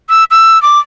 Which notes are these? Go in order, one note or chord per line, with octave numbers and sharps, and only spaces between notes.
E6
E6
D6